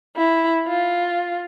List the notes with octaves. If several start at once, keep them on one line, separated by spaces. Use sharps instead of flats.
E4
F4